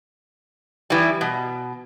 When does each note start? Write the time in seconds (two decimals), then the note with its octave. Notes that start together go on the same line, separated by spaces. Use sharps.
0.90 E3 G3
1.21 B2